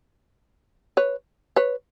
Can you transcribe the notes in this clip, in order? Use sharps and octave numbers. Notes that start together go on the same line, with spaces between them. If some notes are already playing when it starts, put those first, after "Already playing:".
B4 C#5
B4 C#5